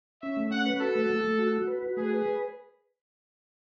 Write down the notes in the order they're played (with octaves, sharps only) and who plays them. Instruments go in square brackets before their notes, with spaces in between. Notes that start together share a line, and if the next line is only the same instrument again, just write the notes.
[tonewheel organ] C#4 [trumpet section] E5
[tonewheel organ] A3
[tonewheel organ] C#4 [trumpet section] F#5
[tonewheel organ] B4
[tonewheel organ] F#4 [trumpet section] A4
[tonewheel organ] A3
A3
A3
F#4
F#4
B4
F#4
[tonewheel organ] A3 [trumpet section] G#4
[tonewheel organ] B4